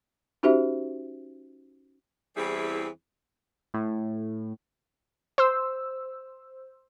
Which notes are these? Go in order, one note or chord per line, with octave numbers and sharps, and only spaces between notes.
C#4 D#4 F#4 G4 C5 E5
E2 E3 G3 C4 E4 G#4
A2
C5 E6